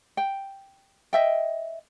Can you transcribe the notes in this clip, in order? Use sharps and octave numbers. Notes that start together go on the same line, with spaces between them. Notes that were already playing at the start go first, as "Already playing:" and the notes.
G5
D#5 E5 G5